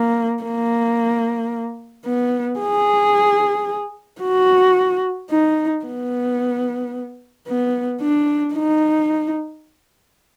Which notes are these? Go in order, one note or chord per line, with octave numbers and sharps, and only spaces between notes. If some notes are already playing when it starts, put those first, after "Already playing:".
Already playing: A#3
A#3
B3
G#4
F#4
D#4
B3
B3
D4
D#4